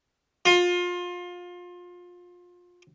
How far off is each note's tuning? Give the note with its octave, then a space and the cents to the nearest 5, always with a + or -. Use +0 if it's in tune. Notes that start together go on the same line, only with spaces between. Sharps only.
F4 +25